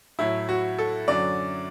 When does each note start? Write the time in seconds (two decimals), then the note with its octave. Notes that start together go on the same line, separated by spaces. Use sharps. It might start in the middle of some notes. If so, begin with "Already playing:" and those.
0.19 A2 F#3 E4
0.49 F#4
0.79 A4
1.08 F#2 D3 F#3 D5